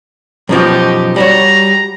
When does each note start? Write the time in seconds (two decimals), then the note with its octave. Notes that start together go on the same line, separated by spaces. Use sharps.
0.49 F#2 B2 F3 D#4 G4
1.16 G3 F#4 C#5 A#5